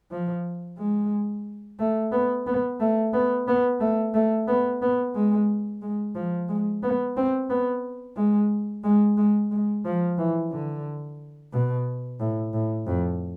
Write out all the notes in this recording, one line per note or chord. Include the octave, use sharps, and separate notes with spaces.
F3
G#3
A3
B3
B3
A3
B3
B3
A3
A3
B3
B3
G#3
G#3
F3
G#3
B3
C4
B3
G#3
G#3
G#3
G#3
F3
E3
D3
B2
A2
A2
F2